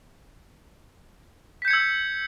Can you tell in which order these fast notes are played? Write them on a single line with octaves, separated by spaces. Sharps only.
B6 G6 C#7 G#6 E6